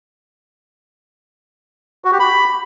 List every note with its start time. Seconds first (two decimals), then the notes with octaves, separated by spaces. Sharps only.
2.05 F#4
2.12 G4
2.20 B5